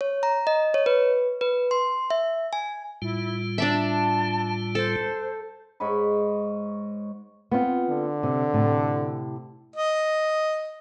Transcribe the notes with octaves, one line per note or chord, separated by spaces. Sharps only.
C#5
A#5
D#5
C#5
B4
B4
C6
E5
G#5
A2 G3 E4 F4
D4 D5 E5 A5
A4 C5
G#2 C#5 D#5 B5
B3 C4 F4
D3
C3
A2 C3 A3
D#5